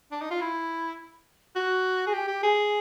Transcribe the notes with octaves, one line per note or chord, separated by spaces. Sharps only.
D4
D#4
F4
E4
F#4
G#4
G4
G4
G#4